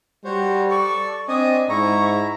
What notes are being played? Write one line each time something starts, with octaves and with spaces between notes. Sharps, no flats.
G3 F#4 C5 C#5
A4 D5 C#6
C4 D4 D#5 G#5 D#6
G#2 E4 A#5 C#6